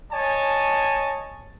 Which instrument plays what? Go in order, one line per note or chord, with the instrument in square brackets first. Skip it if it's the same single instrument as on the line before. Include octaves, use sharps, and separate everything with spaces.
[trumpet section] C#5 D#5 G#5 A5